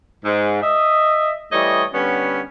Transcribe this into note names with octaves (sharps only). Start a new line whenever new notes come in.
G#2
D#5 E5
E3 G3 A3 C#5 D#5
D3 G3 B3 C#4